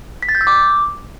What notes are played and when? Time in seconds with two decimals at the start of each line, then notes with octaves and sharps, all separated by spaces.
0.23 B6
0.29 A6
0.35 G6
0.41 E6
0.47 D6